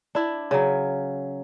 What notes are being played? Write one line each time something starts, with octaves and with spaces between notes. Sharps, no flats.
D4 E4
C#3 F#3